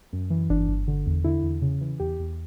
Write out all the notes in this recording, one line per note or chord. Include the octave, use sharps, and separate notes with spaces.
F#2
E3
G1 D4
G1
D3
E2
D3 E4
E2
C#3
E3
E2 G4
E2